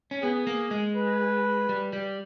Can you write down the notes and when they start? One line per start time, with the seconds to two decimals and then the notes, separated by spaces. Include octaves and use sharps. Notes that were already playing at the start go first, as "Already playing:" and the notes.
0.11 C#4
0.22 B3 G#4
0.47 A#3
0.71 G#3
0.95 B4
1.69 G3
1.93 G3